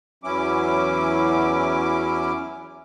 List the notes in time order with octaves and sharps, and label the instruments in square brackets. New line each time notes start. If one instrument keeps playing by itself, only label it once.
[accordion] E2 E3 F#3 C#4 E4 D6